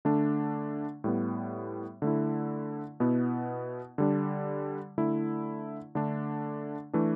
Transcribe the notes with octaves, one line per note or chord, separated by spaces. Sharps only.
D3 A3 D4
A2 G3 B3
D3 A3 E4
B2 B3 E4
D3 G3 D4
D3 A3 E4
D3 A3 D4
E3 A3 D4